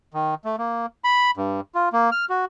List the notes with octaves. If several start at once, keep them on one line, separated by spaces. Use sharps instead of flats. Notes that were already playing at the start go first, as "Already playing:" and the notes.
D#3
A3
A#3
B5
G2
F4
A#3
F6
F#4